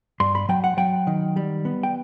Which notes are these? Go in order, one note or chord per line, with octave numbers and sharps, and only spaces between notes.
G2 C6
B5
F#3 G5
F#5
F#3 G5
D#3
G3
B3
G5